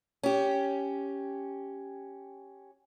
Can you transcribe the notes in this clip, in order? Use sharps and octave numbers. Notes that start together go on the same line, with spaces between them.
C#4 G4